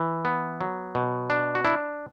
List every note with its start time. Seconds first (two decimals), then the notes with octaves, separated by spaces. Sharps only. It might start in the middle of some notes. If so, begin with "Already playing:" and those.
Already playing: E3
0.25 B3
0.61 F#3
0.95 B2
1.30 D4
1.55 F#4
1.65 D4 E4